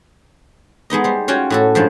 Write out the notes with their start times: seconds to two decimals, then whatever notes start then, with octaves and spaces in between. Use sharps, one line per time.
0.90 G#3 B3 D#4 D#5
1.04 G3 C5
1.28 C#4 F4 F#4 C#5 G5
1.50 A2 F#4 A4
1.75 G2 F3 G#3 A5